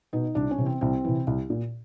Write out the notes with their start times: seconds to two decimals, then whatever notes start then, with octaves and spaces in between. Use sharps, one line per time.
0.13 B2 D#4
0.35 C2 D4
0.51 C#4
0.58 C3 E3
0.66 C4
0.81 C2 C4
1.04 C3 E3
1.27 C2
1.50 A#2